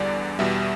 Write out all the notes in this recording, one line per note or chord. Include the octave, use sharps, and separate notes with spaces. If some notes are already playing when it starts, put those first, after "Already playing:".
Already playing: E2 D3 G3 D5
E2 B2 G3 E5